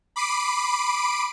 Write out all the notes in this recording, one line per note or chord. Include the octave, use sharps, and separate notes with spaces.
B5 D6 C7 D7 D#7